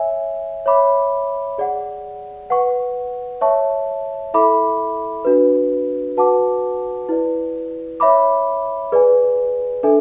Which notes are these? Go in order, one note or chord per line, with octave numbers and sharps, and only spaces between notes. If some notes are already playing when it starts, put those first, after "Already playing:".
Already playing: C#5 E5 G#5
C#5 E5 B5 D6
G#4 D5 F#5
B4 F#5 C#6
C#5 E5 A5 C#6
E4 A4 E5 B5 D6
D4 F#4 B4
F#4 B4 F#5 A5 D6
E4 B4 D5
C#5 E5 B5 D6
G#4 B4 D5 G#5
D4 A4 E5 G#5